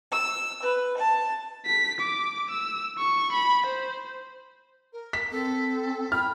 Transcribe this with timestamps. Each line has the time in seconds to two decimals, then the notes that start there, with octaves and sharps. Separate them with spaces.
0.11 E6
0.63 B4
0.97 A5
1.66 B6
2.01 D6
2.51 E6
2.99 C#6
3.33 B5
3.67 C5
4.93 A#4
5.13 B6
5.32 C4 A4
6.12 G5 B5 F6